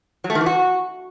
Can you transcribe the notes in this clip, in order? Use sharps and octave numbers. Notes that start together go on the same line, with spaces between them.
F#3
A3
D#3
E3
F#4